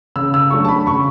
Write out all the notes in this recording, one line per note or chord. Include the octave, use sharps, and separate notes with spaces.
C#3 E6
E6
F#3 A3 D4 C#6
A5
B5
C#3 C#6